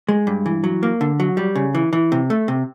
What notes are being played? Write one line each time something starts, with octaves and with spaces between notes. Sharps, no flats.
G#3
G2
E3
F#3
A#3
D3
F#3
G3
C#3
E3
E3
C3
A3
C3